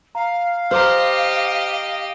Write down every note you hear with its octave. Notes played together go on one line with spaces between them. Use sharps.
F5 A#5
G4 C5 D#5 A#5 D6 F6